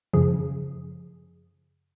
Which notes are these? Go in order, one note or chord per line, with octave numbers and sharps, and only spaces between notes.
F#2 C#3 F3 G#4